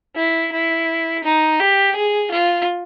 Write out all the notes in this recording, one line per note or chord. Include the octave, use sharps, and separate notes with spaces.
E4
E4
D#4
G4
G#4
F4